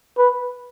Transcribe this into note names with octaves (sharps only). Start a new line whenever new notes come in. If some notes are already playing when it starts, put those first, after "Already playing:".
B4